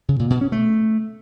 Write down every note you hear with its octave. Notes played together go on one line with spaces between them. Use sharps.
C#3
A#2
B2
C#4
A3